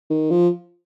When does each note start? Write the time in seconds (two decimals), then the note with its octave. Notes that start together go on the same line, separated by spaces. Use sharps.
0.10 D#3
0.30 F3